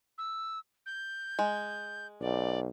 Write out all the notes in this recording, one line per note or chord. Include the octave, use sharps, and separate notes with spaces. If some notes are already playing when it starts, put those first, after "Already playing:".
E6
G6
G#3
B1 D5